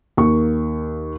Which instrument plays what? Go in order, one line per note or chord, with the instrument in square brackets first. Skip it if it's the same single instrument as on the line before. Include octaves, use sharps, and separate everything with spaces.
[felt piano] D#2 A#3 C#6